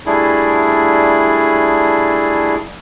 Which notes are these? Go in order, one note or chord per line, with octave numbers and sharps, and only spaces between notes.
G3 A3 D4 E4 G#4